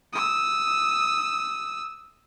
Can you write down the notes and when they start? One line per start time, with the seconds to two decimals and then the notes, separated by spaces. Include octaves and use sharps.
0.13 D#6 E6